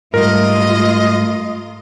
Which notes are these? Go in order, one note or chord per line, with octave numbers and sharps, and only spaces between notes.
G#2 G3 A3 F4 A#4 D#5